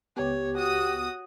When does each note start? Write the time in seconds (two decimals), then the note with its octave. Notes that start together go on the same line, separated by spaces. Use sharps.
0.17 C#2 B3 G4 C#5
0.57 F#4 D#6